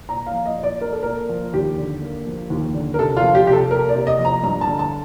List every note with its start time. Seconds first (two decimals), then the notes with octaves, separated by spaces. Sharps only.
0.09 A#2 A#5
0.27 F5
0.33 F3
0.46 D#5
0.57 A#2
0.63 D5
0.81 A#3 A#4
0.93 A4
1.03 A#2 A#4
1.30 F3
1.53 D#2 G4
1.78 D3
2.02 A#3
2.26 F3
2.50 D#2
2.74 D3
2.94 A#4
2.98 C3 A4
3.17 F4
3.22 F3
3.35 G4
3.46 C3 G4
3.53 A4
3.71 A#3 A#4
3.89 D5
3.95 C3
4.07 D#5
4.19 F3
4.25 A#5
4.43 G2 A#5
4.61 A5
4.67 D3
4.79 A5